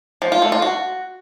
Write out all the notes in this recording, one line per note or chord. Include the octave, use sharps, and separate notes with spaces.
F3
F4
A3
F4
F#4